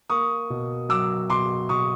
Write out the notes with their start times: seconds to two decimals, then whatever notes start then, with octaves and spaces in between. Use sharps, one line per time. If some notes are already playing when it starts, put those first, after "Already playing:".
0.10 A#3 C#6 D#6
0.50 B2
0.89 F#3 D6 E6
1.30 B2 C6 D6
1.69 B2 C#6 D#6